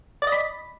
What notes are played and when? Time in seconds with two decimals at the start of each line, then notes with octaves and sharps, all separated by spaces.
0.22 D5
0.27 D#5
0.32 B5